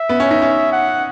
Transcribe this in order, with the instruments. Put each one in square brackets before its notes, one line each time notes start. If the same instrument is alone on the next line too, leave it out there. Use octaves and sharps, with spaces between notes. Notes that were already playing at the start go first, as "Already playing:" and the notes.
Already playing: [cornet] E5
[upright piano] B3
C#4
D#4
C#4
[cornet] F#5